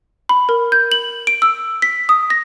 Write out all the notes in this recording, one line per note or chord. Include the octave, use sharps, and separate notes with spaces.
B5
A#4
G6
F#7
D7
E6
B6
D#6
A#6